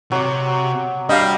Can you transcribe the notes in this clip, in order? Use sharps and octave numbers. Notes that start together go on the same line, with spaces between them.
C3 F#3 D6
G3 D4 D5 D#5 F5